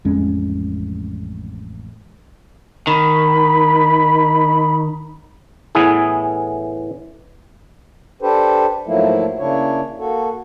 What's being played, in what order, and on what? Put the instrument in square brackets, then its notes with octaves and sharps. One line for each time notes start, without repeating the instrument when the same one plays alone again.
[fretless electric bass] A1 F2 G#3 C#4
[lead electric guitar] D#3 [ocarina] B5
[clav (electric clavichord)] A2 E3 B3 G#4
[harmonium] D4 G4 A4 B4 C5
G#2 F3 F#3 A3 A#3 E4
C#3 A#3 D4 E4 C#5
A#3 F#4 A4